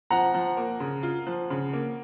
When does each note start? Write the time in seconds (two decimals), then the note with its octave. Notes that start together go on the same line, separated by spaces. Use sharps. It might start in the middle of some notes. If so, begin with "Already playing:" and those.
0.10 F3 F#5 A#5
0.34 F3
0.57 A#3
0.80 C#3
1.03 F4
1.27 F3
1.50 C#3
1.73 A#3